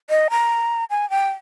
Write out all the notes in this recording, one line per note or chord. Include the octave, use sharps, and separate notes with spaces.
D#5
A#5
G#5
G5